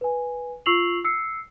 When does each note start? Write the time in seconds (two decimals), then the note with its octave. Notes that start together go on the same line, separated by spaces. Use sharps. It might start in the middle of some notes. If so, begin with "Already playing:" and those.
0.01 B4 G#5
0.66 F4 C#6 E6 C7 F7 F#7
1.04 E6 C7 C#7